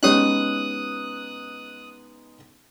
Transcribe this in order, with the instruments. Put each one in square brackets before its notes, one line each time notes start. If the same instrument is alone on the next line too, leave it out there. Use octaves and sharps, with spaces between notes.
[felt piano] G#3 B3 D#4 [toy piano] C#4 G4 C#5 [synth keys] D#6 F#6